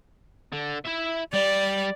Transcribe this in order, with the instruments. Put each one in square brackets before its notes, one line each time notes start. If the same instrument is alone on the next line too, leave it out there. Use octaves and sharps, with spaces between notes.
[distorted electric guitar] D3
E4 E5
[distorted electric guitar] G3 [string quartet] D5